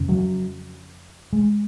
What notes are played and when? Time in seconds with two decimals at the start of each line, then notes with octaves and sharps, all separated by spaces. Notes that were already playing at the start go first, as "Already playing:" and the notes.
Already playing: F2 C#3
0.08 F#3
1.33 G#3